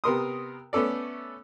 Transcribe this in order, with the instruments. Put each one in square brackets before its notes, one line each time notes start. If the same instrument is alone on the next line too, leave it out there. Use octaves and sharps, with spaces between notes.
[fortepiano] C3 B3 A#4 C6 D#6
A3 B3 C#4 A4 D5